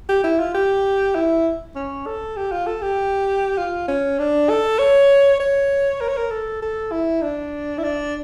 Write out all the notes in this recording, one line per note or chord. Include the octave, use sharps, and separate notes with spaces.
G4
E4
F4
G4
E4
C#4
A4
G4
F4
A4
G4
F4
C#4
D4
A4
C#5
C#5
A#4
C#5
A#4
A4
A4
E4
D4
E4
D4